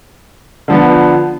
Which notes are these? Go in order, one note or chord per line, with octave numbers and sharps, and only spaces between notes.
D3 F3 B3